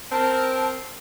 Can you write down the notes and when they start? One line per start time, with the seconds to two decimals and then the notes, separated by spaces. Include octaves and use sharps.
0.11 C4 A#4 A5